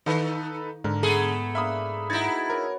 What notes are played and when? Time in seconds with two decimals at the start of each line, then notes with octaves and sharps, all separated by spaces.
0.06 D#3 D#4 A4 B4
0.84 G#2 D3 A#4
1.03 A3 B3 G#4 A4
1.55 A#3 D4 E4 E5 B5 D#6
2.10 D#4 E4 F#4 B4 G#6 A6
2.50 A#4 C#5 D#5